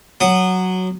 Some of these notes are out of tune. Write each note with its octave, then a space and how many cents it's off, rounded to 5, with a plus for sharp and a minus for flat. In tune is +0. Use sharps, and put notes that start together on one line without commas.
F#3 +0 D#6 -25